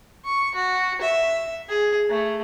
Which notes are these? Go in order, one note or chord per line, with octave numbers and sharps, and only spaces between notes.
C#6
F#4
E5
G#4
A3